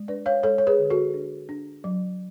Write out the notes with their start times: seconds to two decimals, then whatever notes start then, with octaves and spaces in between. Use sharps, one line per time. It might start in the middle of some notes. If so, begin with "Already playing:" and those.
Already playing: G#3
0.08 D4 B4 D5
0.26 C#5 F5
0.43 G#3 A4 C#5
0.58 C#5
0.67 G#4 B4
0.78 D3
0.90 F#4 A4
1.14 D4
1.49 D4
1.84 F#3